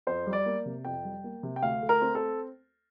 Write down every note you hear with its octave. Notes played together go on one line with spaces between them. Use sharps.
F2 C5
G3
D5
A#3
C3
F2 G5
G3
A#3
C3
G5
D2 F5
A3
A#4
C4
A4